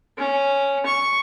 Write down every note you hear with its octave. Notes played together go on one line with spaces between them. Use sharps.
C#4
C#6